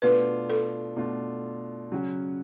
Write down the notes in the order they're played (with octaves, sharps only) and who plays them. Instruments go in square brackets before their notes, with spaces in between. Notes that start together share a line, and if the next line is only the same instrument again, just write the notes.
[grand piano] B2 A3 D4 F4 [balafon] B4
[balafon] A4
[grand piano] B2 A3 D4 F4
C#3 F#3 C#4 F#4